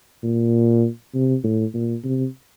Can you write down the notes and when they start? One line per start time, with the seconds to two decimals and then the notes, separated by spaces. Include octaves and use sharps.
0.23 A#2
1.14 C3
1.44 A2
1.74 A#2
2.04 C3